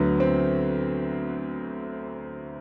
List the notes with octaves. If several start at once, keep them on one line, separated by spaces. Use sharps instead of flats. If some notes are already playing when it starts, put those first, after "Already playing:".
Already playing: D2 D3 F#3 B3
C4